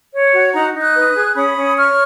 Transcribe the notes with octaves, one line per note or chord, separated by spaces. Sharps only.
C#5
F#4
D#4 F#5 A#5
D#4
D#6 F#6
B4
G#4
C#4 B5 D#6
C#4
C#5 C#6 F6